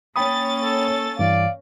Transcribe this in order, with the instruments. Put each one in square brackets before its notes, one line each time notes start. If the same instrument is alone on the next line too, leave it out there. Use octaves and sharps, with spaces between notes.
[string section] A#3 C#4 A6 [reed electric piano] G5 B5 D#6
[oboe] A4
[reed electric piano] G2 E3 [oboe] D5 [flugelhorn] F5